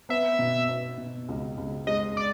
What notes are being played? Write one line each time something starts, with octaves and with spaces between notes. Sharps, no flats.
B3 E5
B2
B3
B2
C#2
C#2
G#3 D#5
D5